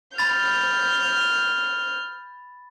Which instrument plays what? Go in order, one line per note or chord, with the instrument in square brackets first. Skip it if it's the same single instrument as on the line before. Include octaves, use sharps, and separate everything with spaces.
[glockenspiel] B5 A6 [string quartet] F6 G6